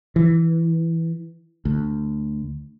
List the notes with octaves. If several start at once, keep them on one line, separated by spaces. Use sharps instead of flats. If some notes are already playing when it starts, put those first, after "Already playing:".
E3
D2